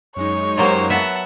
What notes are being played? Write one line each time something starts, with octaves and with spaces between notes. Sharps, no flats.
F#2 G#3 D#4 C#5
F#3 A#3 F4 G4 C5
B3 E5 F#5 A5